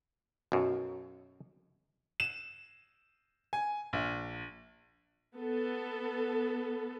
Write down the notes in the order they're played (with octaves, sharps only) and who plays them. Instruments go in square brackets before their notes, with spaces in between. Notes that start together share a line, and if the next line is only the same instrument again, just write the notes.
[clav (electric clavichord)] B1 F#2
[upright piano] E7
G#5
A#1
[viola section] B3 A4